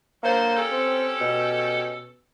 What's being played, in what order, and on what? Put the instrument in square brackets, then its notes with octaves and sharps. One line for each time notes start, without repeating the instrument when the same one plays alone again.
[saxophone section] D3 F#3 C5 [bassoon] A#3
[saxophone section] C#4 G4 A4
[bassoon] C4
B2